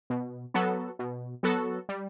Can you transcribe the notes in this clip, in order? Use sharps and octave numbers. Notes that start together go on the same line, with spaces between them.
B2
F#3 B3 F#4 A4
B2
F#3 B3 F#4 A4
G3